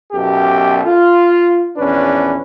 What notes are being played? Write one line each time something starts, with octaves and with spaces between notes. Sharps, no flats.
B1 F#2 B2 G4 A4
F4
A#1 E2 C#4 D4 B4